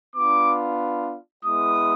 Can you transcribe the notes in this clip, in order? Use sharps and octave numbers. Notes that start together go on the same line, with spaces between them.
B3 D4 F4 D6
G#3 B3 E4 D#6